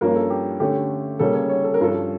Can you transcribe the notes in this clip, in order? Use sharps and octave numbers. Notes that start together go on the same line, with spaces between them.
G2 F3 A#3 C#4 A#4
A4
G4
D3 A3 C#4 G4
C#3 G3 A#3 C#4 A4
C#5
C#5
A4
A#4
G2 F3 C#4 A4